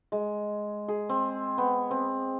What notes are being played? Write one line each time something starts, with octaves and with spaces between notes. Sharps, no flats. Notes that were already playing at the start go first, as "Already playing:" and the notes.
G#3
G#4
C4
B3
C4